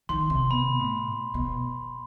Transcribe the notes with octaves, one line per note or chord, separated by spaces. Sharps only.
D#3 C6
C3
B2 B5
A2
B2